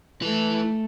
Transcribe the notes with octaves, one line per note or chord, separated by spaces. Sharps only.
A3 E4 B4